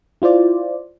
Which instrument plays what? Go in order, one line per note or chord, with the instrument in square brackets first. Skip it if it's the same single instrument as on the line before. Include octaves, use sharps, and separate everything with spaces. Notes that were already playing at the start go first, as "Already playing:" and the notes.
[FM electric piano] E4 F4 C5 D5